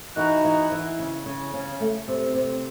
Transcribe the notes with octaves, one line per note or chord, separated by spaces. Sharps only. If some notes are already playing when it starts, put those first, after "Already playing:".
E3 D#4 F#4
E3
E3
C#3
C#3
C#3
A3
C3
C3